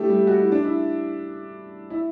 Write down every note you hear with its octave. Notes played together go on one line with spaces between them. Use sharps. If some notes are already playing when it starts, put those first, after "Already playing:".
Already playing: A3 D4 E4 G4
G3
F#4
E4
D4
E4
E4